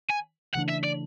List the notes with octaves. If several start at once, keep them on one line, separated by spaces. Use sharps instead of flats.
G#5
C#3 E3 A3 D4 F#5
E5
D5